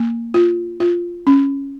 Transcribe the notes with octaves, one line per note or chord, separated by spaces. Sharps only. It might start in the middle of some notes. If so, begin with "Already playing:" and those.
Already playing: A#3
F4
F4
C#4